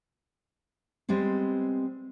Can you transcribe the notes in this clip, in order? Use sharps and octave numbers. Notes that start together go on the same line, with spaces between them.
G3 G#3 B3 C4